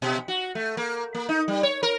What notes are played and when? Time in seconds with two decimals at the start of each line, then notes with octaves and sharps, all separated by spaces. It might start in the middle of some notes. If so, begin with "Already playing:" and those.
0.02 B2
0.28 F#4
0.55 A3
0.77 A#3
1.15 A#3
1.29 D#4
1.48 G3
1.63 C#5
1.83 A#4